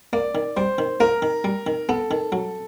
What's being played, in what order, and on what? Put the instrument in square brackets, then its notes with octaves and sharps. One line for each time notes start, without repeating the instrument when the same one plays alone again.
[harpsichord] A#3 [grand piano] D5
[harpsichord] D#3
[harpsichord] G3 [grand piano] C5
[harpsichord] D#3
[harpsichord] A#3 [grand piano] A#4
[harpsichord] D#3
G3
D#3
[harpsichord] B3 [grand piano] A4
[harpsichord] D#3
F#3